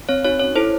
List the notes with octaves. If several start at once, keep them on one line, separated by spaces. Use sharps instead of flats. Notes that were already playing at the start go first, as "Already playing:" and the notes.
C4 C#5
D#4 F#4 C#5
C#4 C#5
E4 A4 C5